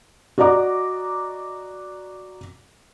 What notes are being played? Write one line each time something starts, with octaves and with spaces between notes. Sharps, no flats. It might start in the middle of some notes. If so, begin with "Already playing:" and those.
F#4 D5 D#5 A#5 D6